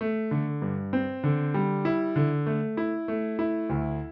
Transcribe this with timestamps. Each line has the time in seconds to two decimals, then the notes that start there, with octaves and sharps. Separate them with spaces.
0.01 A3
0.31 D3
0.62 G2
0.93 C4
1.24 D3
1.54 G3
1.85 E4
2.16 D3
2.46 A3
2.77 E4
3.08 A3
3.39 E4
3.69 D2